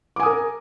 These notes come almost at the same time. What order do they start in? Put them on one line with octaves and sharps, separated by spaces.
D6 G#5 D#6 A#4